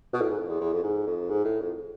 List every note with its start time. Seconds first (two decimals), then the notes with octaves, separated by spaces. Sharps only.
0.13 B2
0.21 A2
0.30 G#2
0.38 F2
0.49 E2
0.60 E2
0.73 F2
0.84 G#2
1.07 F2
1.30 G#2
1.45 A2
1.60 F2